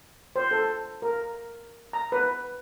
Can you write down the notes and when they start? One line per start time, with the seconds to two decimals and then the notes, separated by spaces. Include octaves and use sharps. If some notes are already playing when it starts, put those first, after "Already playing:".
0.36 C5
0.51 A4
1.02 A#4
1.93 A#5
2.12 B4